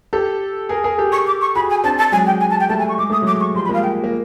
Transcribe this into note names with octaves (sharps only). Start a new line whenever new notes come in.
G4 A4
G#4 A#4
G#4 A#4
G4 A4
C#6
D6
C#6
F#4 G#4 B5
G#5
C4 D4 A5
A5
F#3 G#3 G#5
G5
G#5
A5
G5
G3 A3 A5
G#5
C#6
G#3 D6
A3 D#6
F#3 G#3 D6
C#6
F3 G3 C6
B5
G#3 A#3 F5
G5
A#3